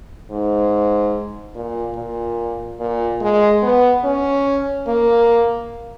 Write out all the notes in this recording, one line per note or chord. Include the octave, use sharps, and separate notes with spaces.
G#2
A#2
A#2
A#2
G#3
B3
C#4
A#3